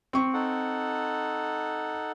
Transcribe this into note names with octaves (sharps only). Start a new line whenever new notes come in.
C4 C#6
D#4 A4 F#5